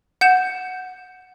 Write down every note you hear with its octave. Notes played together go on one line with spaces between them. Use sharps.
F#5 G6 E7